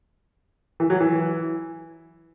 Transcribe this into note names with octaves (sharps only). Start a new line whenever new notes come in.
E3
F#3
E3